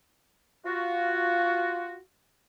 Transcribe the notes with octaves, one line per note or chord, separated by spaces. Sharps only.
F4 F#4